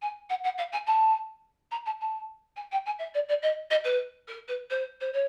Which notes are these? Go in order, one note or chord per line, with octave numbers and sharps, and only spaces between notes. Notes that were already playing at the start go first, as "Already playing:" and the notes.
G#5
F#5
F#5
F5
G#5
A5
A#5
A5
A5
G#5
G5
G#5
E5
D5
D5
D#5
D#5
B4
A#4
B4
C5
C5
C#5